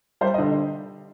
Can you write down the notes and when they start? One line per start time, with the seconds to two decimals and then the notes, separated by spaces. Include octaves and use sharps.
0.21 G3 C5
0.34 D#5
0.38 D3